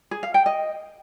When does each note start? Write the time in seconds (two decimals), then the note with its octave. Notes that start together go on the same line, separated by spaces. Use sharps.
0.11 G#4
0.23 F5
0.34 G5
0.46 D#5